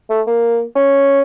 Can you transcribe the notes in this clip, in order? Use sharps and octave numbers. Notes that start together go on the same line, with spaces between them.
A3
A#3
C#4